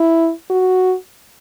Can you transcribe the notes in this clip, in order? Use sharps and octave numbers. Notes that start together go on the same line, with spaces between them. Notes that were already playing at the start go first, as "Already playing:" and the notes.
Already playing: E4
F#4